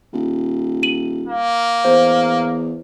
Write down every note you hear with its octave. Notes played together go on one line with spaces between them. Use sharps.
D#1
D#7 F#7
A#3
E2 C5